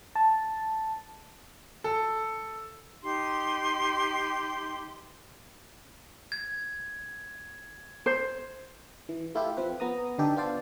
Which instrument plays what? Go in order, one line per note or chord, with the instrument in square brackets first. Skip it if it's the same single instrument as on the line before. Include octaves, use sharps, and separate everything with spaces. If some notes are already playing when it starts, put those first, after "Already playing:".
[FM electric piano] A5
[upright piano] A4
[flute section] D#4 G4 C6
[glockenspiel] G#6
[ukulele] C5
[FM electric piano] E3
A3 E4 F4 G4
F3 C4 B4
B3 A#5 D#6
D3 D#4 G4 A4
B3 D4 F4 C5 D5